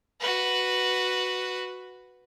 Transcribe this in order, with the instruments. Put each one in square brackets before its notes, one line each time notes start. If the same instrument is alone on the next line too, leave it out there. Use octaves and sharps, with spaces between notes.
[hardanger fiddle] F#4 B4